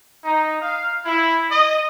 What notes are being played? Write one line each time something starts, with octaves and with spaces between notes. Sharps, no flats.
D#4
F5
E4
D#5